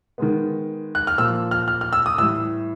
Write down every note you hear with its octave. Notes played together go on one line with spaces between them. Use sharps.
D#3 G#3 B3
F#6
F6
A#2 F3 A#3 E6
F6
F6
F6
E6
D#6
A2 E3 G3 E6